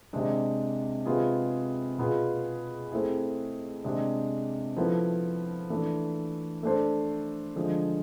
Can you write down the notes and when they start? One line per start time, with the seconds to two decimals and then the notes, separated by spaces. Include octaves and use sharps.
0.13 C3 G#3 D4
1.05 C3 G#3 B3 F4 G#4
1.98 B2 B3 F4 G#4
2.91 A3 C4 E4 G#4
3.84 C3 G#3 D4
4.77 F3 B3 E4 A4
5.70 E3 A3 D4
6.63 A3 D4 A4 C5
7.56 D3 F3 G#3